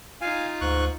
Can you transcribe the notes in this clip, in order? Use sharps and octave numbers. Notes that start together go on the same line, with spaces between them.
D#4 F4 F5 G#5
D2 G#2 C#6 F#6